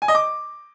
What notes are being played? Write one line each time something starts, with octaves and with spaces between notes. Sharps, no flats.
G#5
D#5
D6